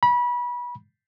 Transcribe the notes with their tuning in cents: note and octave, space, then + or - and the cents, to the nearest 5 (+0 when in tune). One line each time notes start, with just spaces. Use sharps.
B5 -25